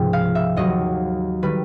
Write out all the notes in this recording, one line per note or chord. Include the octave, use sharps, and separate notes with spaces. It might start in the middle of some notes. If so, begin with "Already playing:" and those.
Already playing: C#2 G#2 C3 F3 G5
F5
E5
D#2 D#3 F#3 D#5
D#3 G3 B4